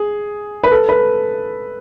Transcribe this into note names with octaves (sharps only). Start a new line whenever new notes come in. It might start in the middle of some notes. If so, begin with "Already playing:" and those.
Already playing: G#4
B4
A4
B4